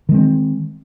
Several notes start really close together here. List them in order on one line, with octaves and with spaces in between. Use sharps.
D#3 G#3 C4